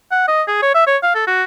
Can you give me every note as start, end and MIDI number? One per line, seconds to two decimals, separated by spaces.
0.11 0.25 78
0.28 0.42 75
0.48 0.60 68
0.62 0.71 73
0.74 0.87 76
0.87 0.97 73
1.03 1.13 77
1.15 1.27 69
1.27 1.44 66